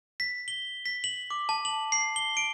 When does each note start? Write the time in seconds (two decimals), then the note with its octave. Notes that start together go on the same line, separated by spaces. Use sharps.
0.20 B6
0.48 G7
0.86 B6
1.04 F#7
1.31 D6
1.49 A5
1.65 F#7
1.92 C7
2.16 G7
2.37 D7